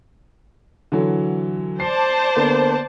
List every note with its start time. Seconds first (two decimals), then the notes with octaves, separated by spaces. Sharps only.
0.92 D3 E3 F#3
1.80 C5 D5 A5 C7
2.36 D3 A#3 B3